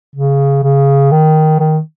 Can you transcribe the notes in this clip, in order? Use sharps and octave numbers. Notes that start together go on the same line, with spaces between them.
C#3
C#3
D#3
D#3